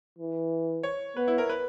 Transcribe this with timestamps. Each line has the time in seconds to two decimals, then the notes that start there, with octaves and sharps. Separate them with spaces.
0.19 E3
0.83 C#5
1.16 B3 B4
1.28 E4
1.38 A#4
1.49 B4